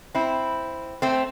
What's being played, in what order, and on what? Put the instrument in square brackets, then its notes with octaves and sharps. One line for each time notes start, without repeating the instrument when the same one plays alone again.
[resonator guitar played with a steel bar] C4 E4
A3 C4